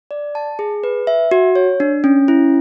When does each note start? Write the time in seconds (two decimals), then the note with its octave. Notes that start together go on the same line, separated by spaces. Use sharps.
0.11 D5
0.35 A5
0.59 G#4
0.84 B4
1.07 E5
1.31 F#4
1.55 C#5
1.80 D4
2.04 C#4
2.28 E4